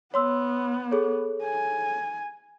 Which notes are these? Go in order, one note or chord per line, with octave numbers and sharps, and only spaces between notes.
B3 C#5 C6 E6
G#4 A4 C#5
G#5